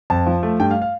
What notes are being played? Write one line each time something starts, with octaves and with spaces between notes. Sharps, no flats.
F2 A5
F3
A3
G2 G5
F5
F5